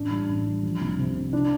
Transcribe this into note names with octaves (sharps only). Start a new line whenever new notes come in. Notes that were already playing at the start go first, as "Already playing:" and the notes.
Already playing: A1 D4
G3
A1
G3
F3
C2
C3
C3
D4